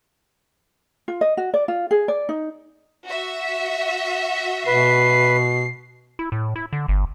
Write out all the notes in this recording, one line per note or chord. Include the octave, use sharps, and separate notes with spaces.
F4
D#5
F#4
D5
F4
G#4
D5
D#4
F#4 E5
B2 B4 C7
E4
A2
E4
D3
G1